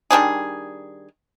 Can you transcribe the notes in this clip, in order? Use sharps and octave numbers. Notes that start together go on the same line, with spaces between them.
D#3 G3 D4 G#4